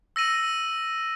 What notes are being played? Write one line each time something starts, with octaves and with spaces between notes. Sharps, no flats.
E6 A#6 D#7 F#7